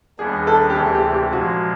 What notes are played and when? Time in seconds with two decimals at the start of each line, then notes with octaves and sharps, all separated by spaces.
0.19 D#2 D#3 G3 B3 D4 G#4
0.47 A4
0.70 G4
0.75 D2 C3 E3 G#4
0.95 G4
1.14 G4
1.33 A#2 F3 G#3 F#4